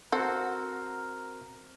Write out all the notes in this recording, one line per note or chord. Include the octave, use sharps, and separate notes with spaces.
C4 F#4 A4 A#4 F#5